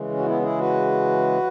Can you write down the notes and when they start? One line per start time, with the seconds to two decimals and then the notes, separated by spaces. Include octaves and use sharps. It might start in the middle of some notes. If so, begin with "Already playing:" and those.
Already playing: C#3 E3 G#3
0.09 C#4
0.19 F#4
0.25 B3 E4
0.42 E4 G#4
0.58 F#4 B4